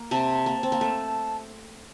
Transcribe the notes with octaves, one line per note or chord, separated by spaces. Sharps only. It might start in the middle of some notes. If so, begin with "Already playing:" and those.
Already playing: A#3
C3 C4 A5
A#3
C4
A#3
A3